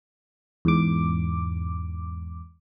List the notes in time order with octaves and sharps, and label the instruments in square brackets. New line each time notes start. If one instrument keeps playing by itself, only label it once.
[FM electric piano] E2 G#2 D6